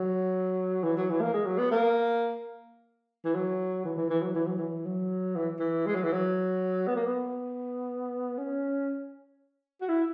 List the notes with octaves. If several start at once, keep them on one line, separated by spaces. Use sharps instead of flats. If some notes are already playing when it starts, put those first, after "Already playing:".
Already playing: F#3
E3
F#3
E3
A#3
G#3
F#3
B3
A#3
E3
F#3
E3
E3
E3
F#3
E3
F#3
E3
F#3
E3
E3
G#3
F#3
E3
F#3
B3
A#3
B3
C#4
F#4
E4